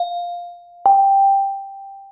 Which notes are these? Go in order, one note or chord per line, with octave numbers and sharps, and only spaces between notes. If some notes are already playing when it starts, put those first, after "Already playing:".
Already playing: F5
G5